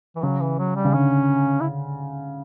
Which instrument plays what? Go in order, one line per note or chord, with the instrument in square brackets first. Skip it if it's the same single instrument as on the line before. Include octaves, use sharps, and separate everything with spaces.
[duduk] E3
[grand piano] C#3 [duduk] F#3
[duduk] E3
F#3
G3
[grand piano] C#3
[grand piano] D3 [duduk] C#4
[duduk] E4